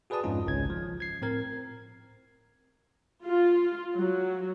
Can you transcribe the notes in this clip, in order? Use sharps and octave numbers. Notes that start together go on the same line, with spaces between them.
F#4 G#4 B4 D5 A5 D#6
F2 G#2 F3 C#4 D#4 F4
G#1 C#2 C#4 G#6
F3
G#6 C7
A2 C4 A#4 G#6
F4
F#3